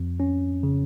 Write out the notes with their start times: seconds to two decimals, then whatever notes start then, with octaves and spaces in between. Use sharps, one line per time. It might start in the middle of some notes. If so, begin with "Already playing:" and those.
Already playing: F2
0.20 C#4
0.63 C#3